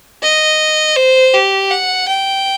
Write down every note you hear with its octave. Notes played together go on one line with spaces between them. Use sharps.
D#5
C5
G4
F#5
G5